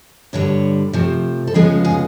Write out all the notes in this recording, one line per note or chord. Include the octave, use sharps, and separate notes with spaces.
G2 D3 G3 C#5
C3 F3 A3
A4
D2 C#3 F3 G#3 B3 G#4
G#4